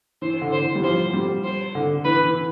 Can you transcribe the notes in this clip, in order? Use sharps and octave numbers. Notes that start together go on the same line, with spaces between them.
E3 C5
D3
C5
E3
G3
F3 C5
G3
C5
D3
E3 B4
E3